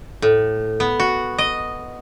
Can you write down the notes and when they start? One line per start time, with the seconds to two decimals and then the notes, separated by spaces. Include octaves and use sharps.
0.22 A2
0.80 B3
1.00 F#4
1.38 D#5